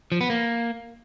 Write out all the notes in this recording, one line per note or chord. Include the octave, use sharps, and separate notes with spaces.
F3
B3
A#3